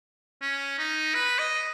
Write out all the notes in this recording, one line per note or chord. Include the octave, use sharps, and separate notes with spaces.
C#4
D#4
B4
D#5